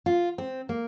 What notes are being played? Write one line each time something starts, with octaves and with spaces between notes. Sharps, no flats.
F4
C4
A#3